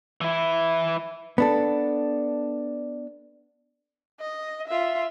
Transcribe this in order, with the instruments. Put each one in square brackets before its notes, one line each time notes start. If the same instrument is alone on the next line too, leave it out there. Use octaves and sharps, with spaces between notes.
[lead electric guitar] E3 E4
[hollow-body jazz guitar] B3 D4 A4
[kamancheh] D#5
F4 E5